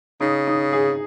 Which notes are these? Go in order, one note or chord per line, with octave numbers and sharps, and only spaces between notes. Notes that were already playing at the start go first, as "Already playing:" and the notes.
C#3 D#4
D#4
G#4